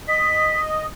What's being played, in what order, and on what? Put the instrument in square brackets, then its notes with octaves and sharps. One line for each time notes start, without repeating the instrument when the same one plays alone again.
[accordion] D#5 [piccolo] B6